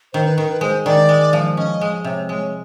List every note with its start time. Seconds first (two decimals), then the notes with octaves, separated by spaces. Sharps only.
0.13 D#3 C5
0.26 B4
0.38 D#3 A#4
0.49 B4
0.61 G#3 C5
0.85 D#3 D5
1.09 G#3
1.33 F3
1.57 C#4 D#5
1.81 G#3
2.04 C3 C#5
2.29 G#3 C#5